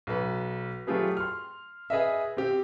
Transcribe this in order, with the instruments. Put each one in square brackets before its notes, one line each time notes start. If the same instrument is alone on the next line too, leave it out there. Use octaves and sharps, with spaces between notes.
[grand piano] B1 B4
F#3 A3 F4 G4 G#4 B4
C6 F6
G#4 B4 D#5 E5
C4 G4